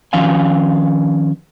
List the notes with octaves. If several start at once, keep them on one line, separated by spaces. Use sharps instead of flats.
D#3 F3 C#4 F5 G#5